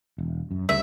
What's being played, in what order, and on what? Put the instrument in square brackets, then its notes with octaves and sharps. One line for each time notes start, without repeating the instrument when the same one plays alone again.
[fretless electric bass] E1
F#2
[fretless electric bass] D2 C#3 G3 [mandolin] E5